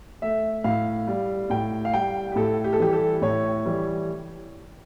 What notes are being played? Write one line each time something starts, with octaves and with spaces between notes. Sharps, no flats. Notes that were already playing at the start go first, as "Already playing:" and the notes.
A3 E5
A2 F5
G3
A2 G5
F5
G3 G5
G4
A2 A4
G4
A4
E3 G3 G4
A4
A2 C#5
E3 G3